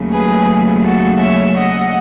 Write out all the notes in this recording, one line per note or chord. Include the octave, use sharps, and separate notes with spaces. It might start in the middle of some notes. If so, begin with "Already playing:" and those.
Already playing: D#2 C#3 F#3 A3
G#4 B4
F#4 A4
C#5 E5
D#5 F#5